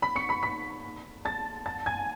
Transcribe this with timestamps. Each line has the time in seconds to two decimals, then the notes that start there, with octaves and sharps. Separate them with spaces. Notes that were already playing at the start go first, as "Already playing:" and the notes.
0.02 B5 B6
0.16 C#6 C#7
0.29 B5 B6
0.43 B5 B6
1.25 A5 A6
1.66 A5 A6
1.86 G#5 G#6